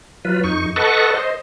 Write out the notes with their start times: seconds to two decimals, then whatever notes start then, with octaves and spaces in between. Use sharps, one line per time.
0.25 F#3 F4 B4
0.44 F2 D#4 C#6
0.76 A4 B4 D#5 F#5 A5 C#6
1.14 C5 D#5